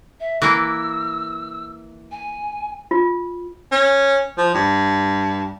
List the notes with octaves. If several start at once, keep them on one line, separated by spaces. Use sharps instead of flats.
E5
E3 A#3 E6
G#5
F4
C#4
F3
G2